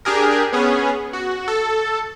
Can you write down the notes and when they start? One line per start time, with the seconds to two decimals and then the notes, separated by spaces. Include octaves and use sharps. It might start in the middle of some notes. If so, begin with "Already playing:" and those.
0.05 D4 G4 G#4 A#4
0.53 B3 C#4 G#4
1.13 F#4
1.48 A4